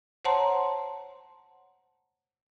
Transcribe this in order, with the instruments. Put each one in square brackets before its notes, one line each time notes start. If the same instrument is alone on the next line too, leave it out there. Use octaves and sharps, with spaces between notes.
[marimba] C5 C#5 F#5 A5 A#5 C6